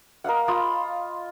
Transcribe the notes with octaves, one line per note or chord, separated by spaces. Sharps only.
A#4 D#5 F5 F#5
F4 B5 C6 D#6